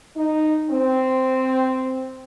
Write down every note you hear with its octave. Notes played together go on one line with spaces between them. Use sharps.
D#4
C4